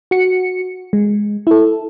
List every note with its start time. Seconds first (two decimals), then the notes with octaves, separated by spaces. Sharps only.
0.11 F#4 C#7
0.93 G#3
1.47 E4 A4